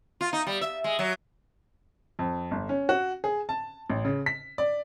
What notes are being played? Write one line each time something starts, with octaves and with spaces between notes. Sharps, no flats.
F4
D#4
G3
E5
G#3
F#3
F2
G1
C#4
F#4
G#4
A5
A1
C#3
B6
D5